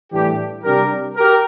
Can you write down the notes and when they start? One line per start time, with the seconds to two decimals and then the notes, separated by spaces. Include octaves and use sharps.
0.10 A2 E3 G3 D4 G4
0.63 C3 G3 D4 G4 A#4
1.16 G4 A#4